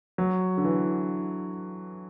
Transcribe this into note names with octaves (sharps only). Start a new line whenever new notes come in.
F#3
D3
E3